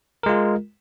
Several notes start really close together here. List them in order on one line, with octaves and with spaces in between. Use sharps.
A#4 G#3 F4